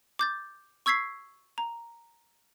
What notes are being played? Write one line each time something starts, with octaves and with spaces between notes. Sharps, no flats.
D6 G6 A6
C#6 E6 G#6 B6 C7
A#5